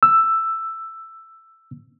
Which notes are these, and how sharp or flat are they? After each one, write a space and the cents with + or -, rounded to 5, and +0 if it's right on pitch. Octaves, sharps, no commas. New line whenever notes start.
E6 +10